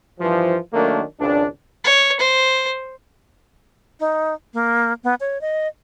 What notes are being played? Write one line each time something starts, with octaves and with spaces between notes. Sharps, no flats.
G2 E3 F3
D#3 F#3 A3 A#3 D4
G#1 C#2 D4
C#5
C5
D#4
A#3
B3
C#5
D#5